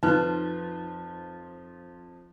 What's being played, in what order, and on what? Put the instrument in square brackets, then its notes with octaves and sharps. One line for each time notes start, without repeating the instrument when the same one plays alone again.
[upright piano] F2 F4 F#6 [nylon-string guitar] F3 [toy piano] D#4 B4